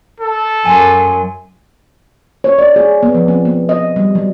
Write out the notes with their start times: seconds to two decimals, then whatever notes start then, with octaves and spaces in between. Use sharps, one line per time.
0.20 A4
0.66 F#2 G#5 C6
2.44 C#5
2.58 D5
2.76 G#4
3.03 B3
3.14 F3
3.28 C4
3.45 B3
3.69 D#5
3.96 G3
4.15 F#3